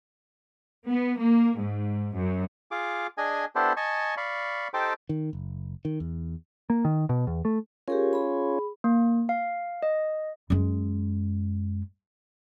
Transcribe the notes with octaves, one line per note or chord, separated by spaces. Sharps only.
B3
A#3
G#2
F#2
F4 G#4 D6
D4 G#4 D#5 G#5
B3 D4 E4 G4 A4 C5
D#5 G#5 A5 C#6
D5 F5 B5 C#6
D#4 G4 A4 C5 G5 D6
D#3
F#1
D#3
E2
A#3
D#3
B2
E2
A3
C#4 F4 G4 G#4 A#4 C#5
G#4 B5
A#3
F5
D#5
F#2 G#3